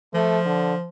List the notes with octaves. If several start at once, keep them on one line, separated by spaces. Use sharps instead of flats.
F3 A3
D3